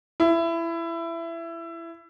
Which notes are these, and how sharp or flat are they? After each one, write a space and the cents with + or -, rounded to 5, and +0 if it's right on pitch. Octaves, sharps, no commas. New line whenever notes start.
E4 +20